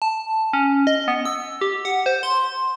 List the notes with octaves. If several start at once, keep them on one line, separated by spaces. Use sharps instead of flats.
A5
C#4
D#5
B3
E6
G4
F#5
C5
C6